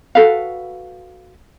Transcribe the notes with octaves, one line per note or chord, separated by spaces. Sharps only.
F#4 A4 B4 F5